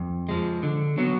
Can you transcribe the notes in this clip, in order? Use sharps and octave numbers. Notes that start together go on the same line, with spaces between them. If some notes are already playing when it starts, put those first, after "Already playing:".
Already playing: F2
F3 G#3
D3
F#3 B3 F#4